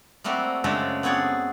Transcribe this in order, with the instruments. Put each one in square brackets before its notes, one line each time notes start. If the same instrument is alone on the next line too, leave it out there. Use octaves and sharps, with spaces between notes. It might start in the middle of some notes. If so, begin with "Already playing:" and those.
[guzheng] G3 A3 A#3 C4 F#4
F#2 C#3 G#3 A3 D4 C5
B3 C4 G#4 C#5 D5